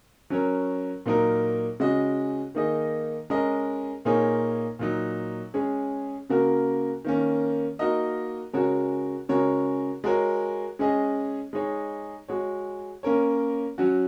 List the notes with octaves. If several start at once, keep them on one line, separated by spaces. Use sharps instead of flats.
F#3 C#4 A#4 C#5
A#2 F#3 A#3 D#4 A#4
C#3 G#3 C#4 F#4 D#5
D#3 A#3 D#4 G#4 D#5
G#3 C#4 A#4 D#5
A#2 A#3 D#4 G#4 C#5
A#2 F#3 D#4
G#3 C#4 G#4 C#5
C#3 A#3 F#4 A#4
D#3 A#3 C#4
A#3 D#4 F#4 A#4 D#5
C#3 G#3 F#4 A#4 C#5
C#3 G#3 F#4 A#4 C#5
G#3 F#4 A#4 C#5
G#3 C#4 G#4 D#5
G#3 D#4 G#4 C#5
G#3 F#4 C#5
A#3 C#4 A#4 C#5
F#3 C#4 F#4